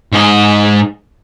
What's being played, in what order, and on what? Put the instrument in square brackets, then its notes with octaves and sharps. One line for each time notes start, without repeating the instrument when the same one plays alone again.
[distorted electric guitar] G#2 D#5